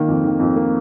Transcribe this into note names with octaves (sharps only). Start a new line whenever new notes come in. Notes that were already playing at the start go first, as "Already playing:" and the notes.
Already playing: D#3 A#3
F2
D#3
F2
A#3